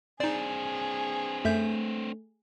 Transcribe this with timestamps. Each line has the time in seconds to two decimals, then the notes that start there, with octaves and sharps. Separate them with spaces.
0.20 C4 D4 D#4 G#4 D5
1.45 F#2 A3 E5 G6